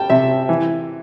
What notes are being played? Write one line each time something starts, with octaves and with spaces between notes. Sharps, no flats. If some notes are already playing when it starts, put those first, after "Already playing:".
Already playing: G3 G5 A5
C3 E5
E3